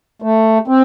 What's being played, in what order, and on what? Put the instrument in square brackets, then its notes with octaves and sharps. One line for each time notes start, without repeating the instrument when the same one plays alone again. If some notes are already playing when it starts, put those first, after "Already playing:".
[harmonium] A3
C4